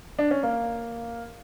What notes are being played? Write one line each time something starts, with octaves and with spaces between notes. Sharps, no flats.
D4
C#4
A#3